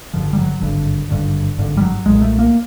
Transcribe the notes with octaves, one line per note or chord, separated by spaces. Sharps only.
G#1 G2 D3 F3
G3
F#3
G#1 G2 D3
G#1 G2 D3
G#1 G2 D3
G3
F#3
B1 A#2 G#3
A3
A#3